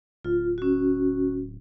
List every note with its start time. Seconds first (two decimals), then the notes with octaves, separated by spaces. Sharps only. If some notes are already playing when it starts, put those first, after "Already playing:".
0.24 D1 F4
0.58 C#4 F#4